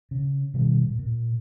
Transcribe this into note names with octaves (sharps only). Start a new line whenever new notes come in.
C#3
B2 D#3 G3
A#2
A#2